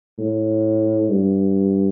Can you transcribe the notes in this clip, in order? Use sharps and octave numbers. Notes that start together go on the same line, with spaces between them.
A2
G2